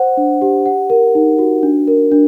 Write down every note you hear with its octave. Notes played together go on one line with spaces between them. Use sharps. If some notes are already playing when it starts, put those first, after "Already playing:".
Already playing: C5 F#5
D4
G4
F#5
A#4
D#4
F#4
D4
A#4
D4